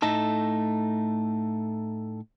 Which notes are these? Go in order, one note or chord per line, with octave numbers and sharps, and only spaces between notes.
A2 A3 D#4 A4